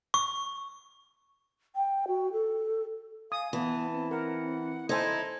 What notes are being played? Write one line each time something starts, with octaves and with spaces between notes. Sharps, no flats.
C#6
G5
F#4
A4
F5 G#5 D#6
E3 B3 A5
C4
A#4 F#5
D#4 E4 A4 C5 G#5 G#6